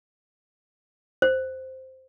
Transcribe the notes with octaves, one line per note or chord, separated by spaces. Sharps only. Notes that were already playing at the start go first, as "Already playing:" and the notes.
C5